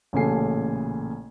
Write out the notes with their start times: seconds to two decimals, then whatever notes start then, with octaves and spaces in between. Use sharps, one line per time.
0.13 A1 A#2 C#3 A4 G#5 C7